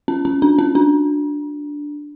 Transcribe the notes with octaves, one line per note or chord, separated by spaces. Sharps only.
C#4
C#4
D4
C#4
D4